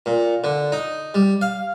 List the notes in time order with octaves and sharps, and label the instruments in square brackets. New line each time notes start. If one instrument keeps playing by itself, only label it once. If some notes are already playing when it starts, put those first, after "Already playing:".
[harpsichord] A#2
D3
D#4
G3
F5